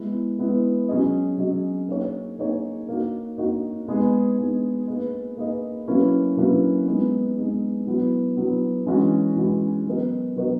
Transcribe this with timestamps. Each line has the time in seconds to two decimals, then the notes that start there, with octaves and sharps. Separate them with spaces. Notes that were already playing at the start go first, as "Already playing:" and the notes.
Already playing: G#3 B3 E4
0.38 G#3 B3 E4
0.88 F#3 C#4 G#4 D#5
1.38 F#3 C#4 G#4 D#5
1.88 A#3 D#4 G#4 C#5
2.38 A#3 D#4 G#4 C#5
2.88 A#3 D#4 F#4
3.38 A#3 D#4 F#4
3.88 G#3 B3 D#4 G#4
4.38 G#3 B3 D#4 G#4
4.87 A#3 D#4 G#4 B4 D#5
5.37 A#3 D#4 G#4 B4 D#5
5.88 F#3 A#3 C#4 E4 B4
6.37 F#3 A#3 C#4 E4 B4
6.87 G#3 B3 D#4 G#4
7.37 G#3 B3 D#4 G#4
7.87 F#3 B3 E4
8.36 F#3 B3 E4
8.86 E3 G#3 C#4 F#4
9.36 E3 G#3 C#4 F#4
9.85 F#3 B3 F#4 A#4 D#5
10.36 F#3 B3 F#4 A#4 D#5